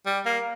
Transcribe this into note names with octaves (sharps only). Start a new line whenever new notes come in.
G3
A#3